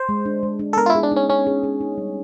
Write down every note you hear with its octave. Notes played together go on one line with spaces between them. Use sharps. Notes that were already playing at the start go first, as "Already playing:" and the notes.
Already playing: C5
G#3
D4
G#3
D4
A4
B3 A#4
F4
E4
G#4
D4
C#4 D#4
C#4 C#5
G#4
G#4
D#4
G3